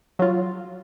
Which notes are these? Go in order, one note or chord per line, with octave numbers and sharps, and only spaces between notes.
F#3 F4